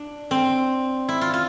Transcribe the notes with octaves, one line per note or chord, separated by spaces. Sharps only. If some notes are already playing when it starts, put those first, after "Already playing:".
Already playing: D4
C4
E4
F4
F4